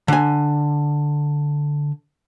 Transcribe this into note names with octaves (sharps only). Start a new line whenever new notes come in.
D3 G#5